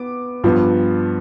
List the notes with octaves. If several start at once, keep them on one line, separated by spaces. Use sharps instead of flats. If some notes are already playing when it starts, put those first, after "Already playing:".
Already playing: B3 D6
G2 F3 B3